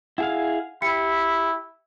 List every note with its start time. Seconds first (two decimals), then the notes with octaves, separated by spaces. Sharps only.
0.18 E4 G#4 F5 F#5
0.82 E4 G4 C#7